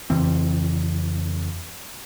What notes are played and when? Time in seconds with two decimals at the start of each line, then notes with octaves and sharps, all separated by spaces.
0.10 F2 C#3 E3 C4